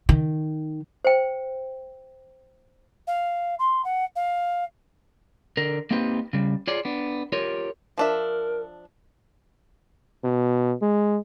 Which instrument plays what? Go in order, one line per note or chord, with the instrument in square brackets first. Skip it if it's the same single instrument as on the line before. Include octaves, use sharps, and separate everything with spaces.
[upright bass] D#3
[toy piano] C5 G5
[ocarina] F5
C6
F#5
F5
[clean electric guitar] D3 A#4
A#3 C4 D#4 G4 B4
C#3 G3
F4 G#4 C#5 D5
B3 D4
F4 G4 A#4 C#5
[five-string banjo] F3 D4 E5 [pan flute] A#4
[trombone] B2
G#3